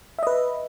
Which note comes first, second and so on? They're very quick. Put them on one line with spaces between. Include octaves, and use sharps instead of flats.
E5 D#5 B4